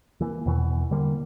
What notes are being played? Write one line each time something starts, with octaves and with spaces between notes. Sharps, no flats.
E3 A#3
E2 B2 E3
D3 G3 A#3